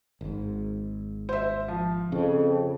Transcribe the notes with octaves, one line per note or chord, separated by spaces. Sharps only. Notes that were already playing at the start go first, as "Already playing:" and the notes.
G#1 G#2
C5 E5
F3
F2 C#3